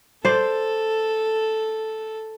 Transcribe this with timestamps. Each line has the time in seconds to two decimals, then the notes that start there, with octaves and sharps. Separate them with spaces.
0.25 A4 C5 D5